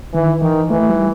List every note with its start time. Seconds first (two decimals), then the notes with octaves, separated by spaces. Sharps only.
0.14 D#3 E3
0.42 D#3 E3
0.70 E3 A3
0.89 G3